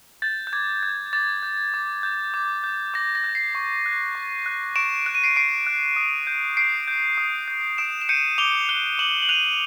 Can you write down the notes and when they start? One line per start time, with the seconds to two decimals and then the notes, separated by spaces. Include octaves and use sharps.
0.22 G6 A6
0.47 G6
0.53 D6 G#6
0.83 G6
1.13 D6 A6
1.43 G6
1.74 D6
2.03 G6
2.34 D6
2.64 G6
2.94 D6 A#6
3.15 A#6
3.24 G6
3.35 C7
3.55 C#6
3.86 F#6
4.15 C#6
4.46 F#6
4.76 C#6 D7 E7
5.06 F#6 D7
5.15 D#7
5.24 C7 D7
5.36 C#6 C7 D7
5.67 F#6
5.96 D#6
6.27 G6
6.57 D#6 C7 D7
6.88 G6
7.18 D#6
7.48 G6
7.78 D#6 D7 E7
8.02 E7
8.09 G6 C#7 D#7
8.38 D6 F7 G7
8.69 F#6 F7 G7
8.99 D6 E7 F#7
9.22 F#7
9.29 F#6 D#7 F7